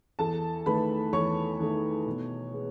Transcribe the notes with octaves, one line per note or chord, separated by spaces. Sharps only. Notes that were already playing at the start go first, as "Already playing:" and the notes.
E2 A4 A5
D#3 A3 B4 B5
E2 C#5 C#6
D#3 A3
B2
G#3 B3